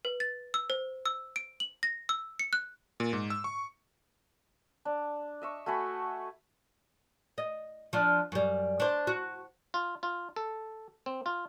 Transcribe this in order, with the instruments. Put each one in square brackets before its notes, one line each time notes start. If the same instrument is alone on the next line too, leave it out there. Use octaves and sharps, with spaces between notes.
[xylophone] B4
A6
E6
C5
E6
D7
F#7
A#6
E6
C#7
F#6
[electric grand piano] A#2
G#2
E6
C#6
[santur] D4
D#5 E5 C#6
A3 F#4 G#5 B5
[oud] D#5
F3 D4
F#2 G3
D4 C5
F#4
[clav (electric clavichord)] F4
F4
A4
C4
F4